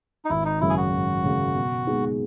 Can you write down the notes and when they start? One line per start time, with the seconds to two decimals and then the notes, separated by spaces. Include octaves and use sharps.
0.25 D#4
0.30 G#1 E4
0.45 D#4
0.61 F#2 C#3 F#3 E4
0.70 G#4
0.77 F#4
0.93 G#1
1.24 F#2 C#3 F#3
1.55 B2
1.87 G#3 B3 D#4